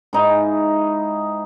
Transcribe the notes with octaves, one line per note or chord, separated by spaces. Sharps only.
G#2 D#4 E4